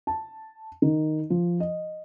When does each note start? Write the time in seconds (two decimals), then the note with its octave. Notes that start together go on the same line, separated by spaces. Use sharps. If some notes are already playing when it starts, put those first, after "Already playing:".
0.07 A5
0.82 D#3
1.30 F3
1.60 D#5